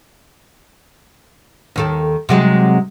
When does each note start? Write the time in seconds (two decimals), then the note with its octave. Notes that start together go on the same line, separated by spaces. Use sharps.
1.76 D#2 D#3 A4
2.29 C3 F#3 G#3